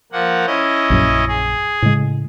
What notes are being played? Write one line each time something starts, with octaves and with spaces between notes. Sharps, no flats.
F3 A#3 F#5
C#4 E4 D#5
A#1 F#2 F#3
G#4
A2 C#3 G#3